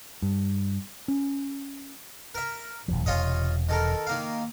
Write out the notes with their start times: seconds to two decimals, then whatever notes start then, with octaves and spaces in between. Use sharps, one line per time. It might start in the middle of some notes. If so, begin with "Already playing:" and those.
0.22 G2
1.08 C#4
2.35 A#4 E5
2.88 D#1 D2 F3
3.06 E1 C3 F4 C#5 D#5
3.69 D#3 A4 A#4
4.07 D#3 A#3 F5